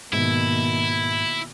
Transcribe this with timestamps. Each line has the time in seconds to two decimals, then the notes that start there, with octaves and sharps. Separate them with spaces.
0.13 G#2 B2 D#3 A#3 E4